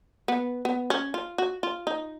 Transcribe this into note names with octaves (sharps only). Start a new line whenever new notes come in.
B3
B3
C#4
F4
F#4
F4
D#4